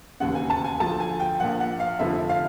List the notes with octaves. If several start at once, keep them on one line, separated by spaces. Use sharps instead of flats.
E1 D#2 C#3 F#5
G#5
A5
G#5
D2 D3 F3 A5
G#5
G5
A#1 A#2 F3 F#5
F#5
F5
F1 F2 D3 F3 E5
F5